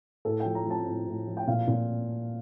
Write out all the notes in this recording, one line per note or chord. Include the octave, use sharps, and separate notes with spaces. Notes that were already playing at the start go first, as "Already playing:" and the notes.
A2 A4
G5
F3
A#5
F3 A5
A2
A2
F3
G5
A#2 F5
A#2